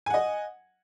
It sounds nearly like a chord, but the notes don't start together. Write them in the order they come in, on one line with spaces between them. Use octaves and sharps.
G#5 F#5 D#5